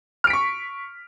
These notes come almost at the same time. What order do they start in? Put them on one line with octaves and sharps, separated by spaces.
F6 D7 B6 C#6